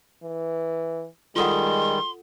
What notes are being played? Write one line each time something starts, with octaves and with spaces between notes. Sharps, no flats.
E3
D#3 G3 G#3 F4 A4 F#5 C6